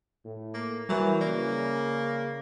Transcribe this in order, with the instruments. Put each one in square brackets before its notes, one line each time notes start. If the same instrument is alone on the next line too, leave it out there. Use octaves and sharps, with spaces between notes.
[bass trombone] A2
[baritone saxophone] A#3
[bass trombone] E3 [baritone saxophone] F#3 [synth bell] G3 A#4
[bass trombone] C#3 [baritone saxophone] A#3 [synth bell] D5